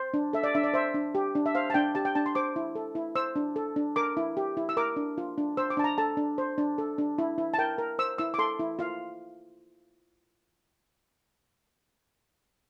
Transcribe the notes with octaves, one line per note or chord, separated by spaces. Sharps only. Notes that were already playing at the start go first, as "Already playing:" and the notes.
Already playing: C5
D4
A4 E5
D5
D4 E5
D5
C5 E5
D4
G4
D4
E5
C5 F5
A5
D4 G5
G4 A5
G5
D4 A5
C6
C5 D6
E4
A4
E4
C5 E6
D4
A4
D4
A#4 D6
E4
G4
E4
E6
A#4 D6
D4
F4
D4
C5 E6
D6
D4 A5
A#5
A4 A5
D4
C5
D4
A4
D4
E4
E4
A5
A#4 G5
A#4
C5 E6
E4 E6
D6
A4 C6
E4
F4 F5